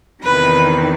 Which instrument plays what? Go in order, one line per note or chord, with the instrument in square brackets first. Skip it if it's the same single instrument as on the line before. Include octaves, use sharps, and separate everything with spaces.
[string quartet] E2 C3 D#3 B4